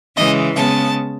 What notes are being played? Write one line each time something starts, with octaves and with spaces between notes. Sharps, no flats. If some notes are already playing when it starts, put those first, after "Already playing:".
C#3 E3 G#3 D#5
C#3 G#3 B3 A5